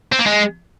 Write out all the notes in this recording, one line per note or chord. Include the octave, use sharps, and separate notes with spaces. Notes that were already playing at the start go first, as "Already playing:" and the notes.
C4
A#3
G#3